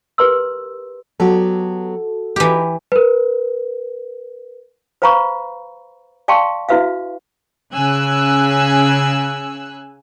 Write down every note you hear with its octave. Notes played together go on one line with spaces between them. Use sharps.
G4 A#4 B4 A#5 C6 E6
F#3 B3 F#4 G4 A4
E3 D#4 G4
A#4 B4
B4 C5 F5 A#5 B5 C#6
D5 F5 G5 A5 C6 C#6
E4 F#4 B4 E5 F5
C#3 G#5 E6 F#6